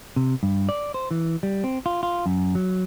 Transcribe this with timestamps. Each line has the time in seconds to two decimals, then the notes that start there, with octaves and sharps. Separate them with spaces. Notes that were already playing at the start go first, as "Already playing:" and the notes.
0.16 C3
0.43 G2
0.69 D5
0.94 C5
1.11 E3
1.43 G3
1.64 C4
1.86 F4
2.03 F4
2.26 F#2
2.55 F#3